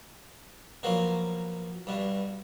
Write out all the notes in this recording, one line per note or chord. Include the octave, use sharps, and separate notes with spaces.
B2 F3 F#3 A#3
G2 B2